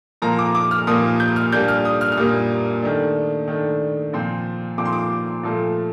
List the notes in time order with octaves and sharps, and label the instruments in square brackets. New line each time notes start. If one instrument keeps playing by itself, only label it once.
[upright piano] A#2 F3 A#3 A#5
D6
D6
F6
A#2 F3 A#3 D#6
G6
F6
A#2 G3 A#3 D4 G6
F6
D#6
F6
F6
A#2 G3 A#3 D4 D#6
D#3 A3 D4
D#3 A3 D4
A#2 F3 C4
A#2 F3 C4 D6
C6
D6
A#2 F3 A3